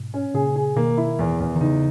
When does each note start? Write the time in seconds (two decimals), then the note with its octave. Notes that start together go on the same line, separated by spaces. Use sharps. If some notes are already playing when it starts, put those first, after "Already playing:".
Already playing: G#2 B2
0.14 C#4
0.34 A#2 C#3 G#4
0.56 G#4
0.76 B2 D#3 A#3
0.97 E4
1.19 E2
1.40 E2
1.55 D#3
1.61 C#3 E3 D#4